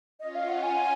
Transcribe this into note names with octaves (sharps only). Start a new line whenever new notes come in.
C#4 F4 D#5
F5
F#5
G#5